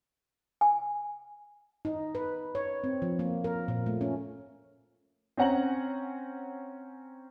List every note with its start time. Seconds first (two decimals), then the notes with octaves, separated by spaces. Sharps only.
0.61 G#5
1.85 D#4
2.15 B4
2.55 C#5
2.84 C4
3.02 F3
3.19 A#3
3.44 A#4
3.68 A#2
3.86 A3
4.01 C#4
5.37 C4 C#4 F#5 A#5 F#7